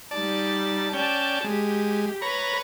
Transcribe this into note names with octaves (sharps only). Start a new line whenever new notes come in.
G3 D#4 D5 A5
C#4 D5 G5 A5
G#3 G4
B4 C#5 A#5 B5